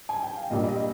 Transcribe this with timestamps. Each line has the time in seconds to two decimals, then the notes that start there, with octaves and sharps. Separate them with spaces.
0.09 G#5
0.23 G5
0.36 F5
0.50 A#1 A#2 G3 D#5
0.68 D#5